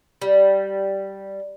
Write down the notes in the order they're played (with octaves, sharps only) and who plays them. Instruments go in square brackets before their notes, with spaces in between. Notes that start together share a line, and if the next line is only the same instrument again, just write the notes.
[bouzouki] G3